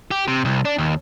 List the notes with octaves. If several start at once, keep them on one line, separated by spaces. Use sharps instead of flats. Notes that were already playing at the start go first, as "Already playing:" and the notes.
G4
C3
C2
D4
D#2